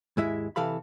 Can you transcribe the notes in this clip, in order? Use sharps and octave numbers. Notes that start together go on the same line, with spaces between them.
D#2 G#2 G#3 E4 E5
C3 E3 A4 F5 B5